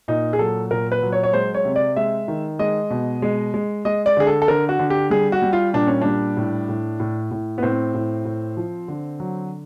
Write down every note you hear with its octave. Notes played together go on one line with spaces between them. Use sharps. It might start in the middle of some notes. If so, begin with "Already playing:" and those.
A#2 D#4
G#4
F#3 A4
A#2 A#4
B4
F#3
C#5
C#5
G#3 C5
C#5
C3
D5
G#3 E5
D#3
G#3 D#5
B2
G#3
G#3
G#3 D#5
D5
D3 G#4
A4
A4
D3 A#4
F#4
D3
G4
G3 G#4
F#4
G3
F4
A#2 D4
C#4
G3 D4
A2
A2
A2
A2
B3
A2 C4
A2
A2
F3
D3
F#3